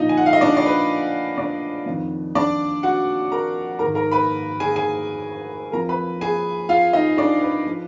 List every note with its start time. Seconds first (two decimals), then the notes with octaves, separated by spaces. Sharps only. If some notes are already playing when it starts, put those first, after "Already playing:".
Already playing: A#2 F3 D#4 D#5
0.09 G#5
0.17 F#5
0.26 F5
0.33 D#5
0.41 D4 D5
0.57 D5
0.66 B4
1.38 D4 D5
1.86 F2 D#3
2.35 D4 D5
2.83 F#4 F#5
3.32 A#4 A#5
3.79 G#2 D#3 A#4 A#5
3.95 A#4 A#5
4.11 B4 B5
4.60 G#4 G#5
4.76 G#4 G#5
5.72 F2 F3 A#4 A#5
5.89 B4 B5
6.21 G#4 G#5
6.69 F4 F5
6.93 D#4 D#5
7.18 D4 D5
7.41 B4
7.66 F3